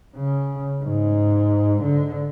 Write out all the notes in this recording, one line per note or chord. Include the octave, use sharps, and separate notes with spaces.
C#3
G#2
D3